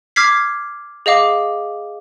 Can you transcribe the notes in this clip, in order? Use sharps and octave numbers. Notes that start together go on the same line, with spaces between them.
D6 F6 G#6 B6 C7
G#4 D#5 F5 D6